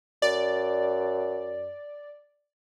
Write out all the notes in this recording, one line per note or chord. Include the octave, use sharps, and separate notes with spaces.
F#2 D5